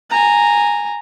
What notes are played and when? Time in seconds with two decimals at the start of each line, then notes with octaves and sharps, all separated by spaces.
0.10 G#5 A#5